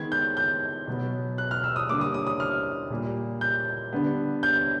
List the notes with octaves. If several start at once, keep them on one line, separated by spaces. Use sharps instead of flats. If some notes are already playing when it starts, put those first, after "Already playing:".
Already playing: D#3 G#3 B3 G#6
G6
G6
B2 F#3 B3
F#6
F6
E6
D#6
D3 G3 A#3 D6
D#6
D#6
D#6
F6
A#2 G3 A#3
G6
D3 G3 B3
G6